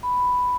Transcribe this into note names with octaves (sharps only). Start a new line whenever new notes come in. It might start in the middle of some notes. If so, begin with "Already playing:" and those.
B5